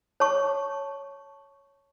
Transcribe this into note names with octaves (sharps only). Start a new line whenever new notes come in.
C#5 A5 C#6